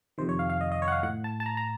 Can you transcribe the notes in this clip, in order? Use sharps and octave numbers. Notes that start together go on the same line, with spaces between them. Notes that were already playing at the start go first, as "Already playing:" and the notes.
F2 C3 D#3 C5
C#5
F5
F5
D#5
D#5
C#5
F#5
F5
A2 F#5
A5
A5
A#5
A#5